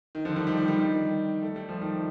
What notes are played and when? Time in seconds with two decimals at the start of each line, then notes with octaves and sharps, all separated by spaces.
0.15 D#3
0.25 D3 F3
0.36 D#3 G3
0.47 D#3 G3
0.57 D#3
0.68 D#3 G3
0.78 D#3 G3
1.42 A3
1.56 G3
1.69 F3
1.81 D#3 G3